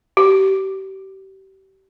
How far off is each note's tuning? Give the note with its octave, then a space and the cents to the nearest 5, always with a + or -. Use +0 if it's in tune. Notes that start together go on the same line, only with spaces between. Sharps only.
G4 -35